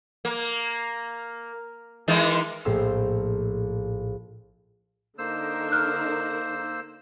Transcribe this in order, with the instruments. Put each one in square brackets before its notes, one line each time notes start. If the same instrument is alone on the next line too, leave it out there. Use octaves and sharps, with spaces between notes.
[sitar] A#3
D#3 E3 G#3
[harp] A#1 A2 C6 E6
[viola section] D3 D#4 A#4 [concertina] A#3 C5 E6
[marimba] F6 F#6